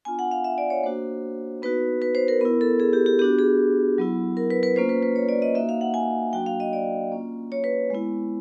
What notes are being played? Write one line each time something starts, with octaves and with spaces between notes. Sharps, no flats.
B3 D4 F4 G#5
F#5
F5
E5
D5
C#5
A#3 D4 F#4 C5
B3 D#4 F#4 B4
B4
C5
A#4
B3 E4 A#4
A4
G#4
G4
G4
B3 D4 F#4 G4
G#4
F#3 B3 E4
A#4
B4
B4
A#3 C#4 F4 C5
B4
B4
C#5
D5
D#5
A#3 D#4 F#4 E5
F5
F#5
G#5
F#3 A#3 D4 F#4 G5
F5
D#5
D5
A#3 C#4 F4
C#5
B4
G#3 B3 E4